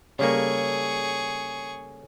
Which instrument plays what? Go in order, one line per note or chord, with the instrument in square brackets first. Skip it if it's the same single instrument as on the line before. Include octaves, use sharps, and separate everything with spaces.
[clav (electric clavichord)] C#3 G3 A#3 [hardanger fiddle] G#4 C#6 [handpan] A4 C#5